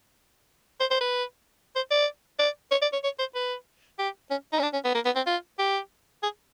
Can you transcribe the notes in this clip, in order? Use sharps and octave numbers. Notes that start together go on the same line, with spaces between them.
C5
C5
B4
C5
D5
D5
C#5
D5
C#5
C#5
C5
B4
G4
C#4
D#4
C#4
D4
C#4
B3
A#3
B3
C4
F4
G4
G#4